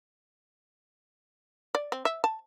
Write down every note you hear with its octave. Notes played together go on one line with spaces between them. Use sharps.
D5
C4
E5
A5